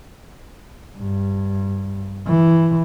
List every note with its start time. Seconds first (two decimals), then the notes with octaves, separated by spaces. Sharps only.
0.98 G2
2.26 E3